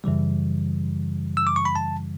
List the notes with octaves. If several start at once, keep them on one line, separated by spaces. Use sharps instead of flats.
F#2 C#3 E3 G3
E6
D6
C#6
B5
A5